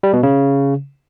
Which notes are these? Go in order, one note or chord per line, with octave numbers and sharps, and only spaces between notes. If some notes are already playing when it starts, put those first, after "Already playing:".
G3
B2
C#3